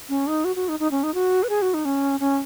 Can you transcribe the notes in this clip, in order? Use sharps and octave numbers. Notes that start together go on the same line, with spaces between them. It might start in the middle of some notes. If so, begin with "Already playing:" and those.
C#4
D#4
F#4
F#4
D#4
D#4
C#4
D#4
F#4
B4
G#4
F#4
D#4
C#4
C#4